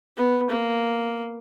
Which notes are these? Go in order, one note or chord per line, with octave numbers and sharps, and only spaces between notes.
B3
A#3